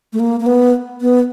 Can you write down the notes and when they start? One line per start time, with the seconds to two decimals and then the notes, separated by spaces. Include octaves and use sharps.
0.13 A3
0.20 A#3
0.40 A#3
0.46 B3
1.01 B3